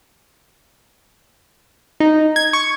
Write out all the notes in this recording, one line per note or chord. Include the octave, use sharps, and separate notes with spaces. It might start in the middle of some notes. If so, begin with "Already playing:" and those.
D#4
G#6
C#6